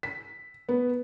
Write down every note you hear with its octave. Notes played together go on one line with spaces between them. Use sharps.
B6
B3